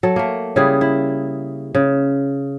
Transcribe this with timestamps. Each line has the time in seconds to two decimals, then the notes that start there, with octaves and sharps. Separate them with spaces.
0.03 F#3 A4
0.16 A3 A#3
0.56 C#3 G3 E4 G#4
0.81 E4
1.75 C#3